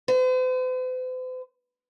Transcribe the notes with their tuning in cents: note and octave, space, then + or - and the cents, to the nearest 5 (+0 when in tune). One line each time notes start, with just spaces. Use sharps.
C5 -45